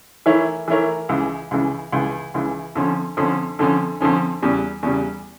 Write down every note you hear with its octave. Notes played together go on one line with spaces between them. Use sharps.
E3 A3 E4 A#4 C#5
E3 A3 E4 A#4 C#5
C#2 C#3 E3
C#2 C#3 E3
C#2 C#3 E3
C#2 C#3 E3
F2 D3 F3 C#4
F2 D3 F3 C#4
F2 D3 F3 C#4
F2 D3 F3 C#4
E2 C#3 G3
E2 C#3 G3